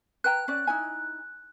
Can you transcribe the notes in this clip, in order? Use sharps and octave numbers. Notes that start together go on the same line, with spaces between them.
B4 G5 A#5 F#6
C#4 D5
D#4 E4 G#5